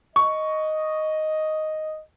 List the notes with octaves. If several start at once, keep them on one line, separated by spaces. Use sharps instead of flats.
D#5 C#6